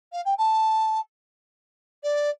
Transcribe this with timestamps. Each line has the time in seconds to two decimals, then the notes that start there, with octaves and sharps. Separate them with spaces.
0.12 F5
0.25 G5
0.38 A5
2.03 D5